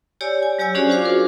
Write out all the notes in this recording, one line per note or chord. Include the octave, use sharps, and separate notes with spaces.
G4 C#5 D5 G#5 E6
G#5
F#3 G4 C#5 G#5 E6
C#4 D4 F#4 G#4 C5 D5
F4 F#4 G#4 C5 F5 D6
F4 A#4